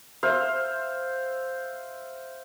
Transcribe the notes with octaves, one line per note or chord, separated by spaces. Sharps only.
C5 E5 F5